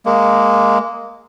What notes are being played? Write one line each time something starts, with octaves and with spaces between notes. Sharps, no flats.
G#3 A#3